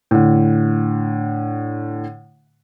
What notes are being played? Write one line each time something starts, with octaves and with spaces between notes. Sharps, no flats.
A2 D3